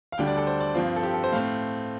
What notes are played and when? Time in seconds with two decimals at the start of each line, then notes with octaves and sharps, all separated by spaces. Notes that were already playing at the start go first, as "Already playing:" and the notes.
0.12 F5
0.18 D2 D3 G3 D4 G5
0.27 D5
0.38 A4
0.47 C5
0.60 D5
0.75 G2 F3 C4 F4
0.96 A4
1.03 G4
1.14 A4
1.24 C5
1.33 A2 A3 C4 F5